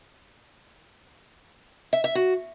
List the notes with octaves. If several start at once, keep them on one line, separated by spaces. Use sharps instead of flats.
E5
E5
F#4